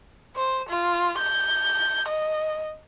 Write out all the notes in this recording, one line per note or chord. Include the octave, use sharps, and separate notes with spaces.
C5
F4
G6
D#5